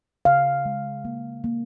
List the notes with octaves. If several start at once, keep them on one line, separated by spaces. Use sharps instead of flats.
C#3 F5
G#3
A#3
A#3